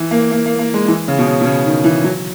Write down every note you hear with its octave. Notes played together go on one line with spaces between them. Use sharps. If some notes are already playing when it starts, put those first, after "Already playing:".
Already playing: E3
A#3
A#3
A#3
A#3
G#3
E3
C#3
B2
C#3
B2
C#3
D#3
E3
F#3